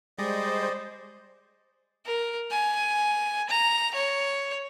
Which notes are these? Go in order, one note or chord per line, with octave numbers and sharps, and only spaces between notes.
G3 G#3 C5 D5 D#5
A#4
G#5
A#5
C#5